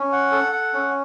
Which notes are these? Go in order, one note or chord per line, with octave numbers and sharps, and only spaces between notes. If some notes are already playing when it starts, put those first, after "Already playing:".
Already playing: C#4
F#5
A4
F#5
C#4